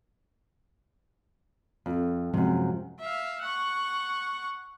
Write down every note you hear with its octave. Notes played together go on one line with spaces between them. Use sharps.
F2
F#2 C3 F3 G#3
E5 F5
F#5 C#6